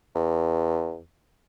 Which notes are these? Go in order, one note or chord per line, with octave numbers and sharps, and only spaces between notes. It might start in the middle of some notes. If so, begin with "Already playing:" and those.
E2